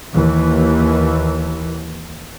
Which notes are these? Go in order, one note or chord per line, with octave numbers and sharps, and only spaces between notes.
D#2 E3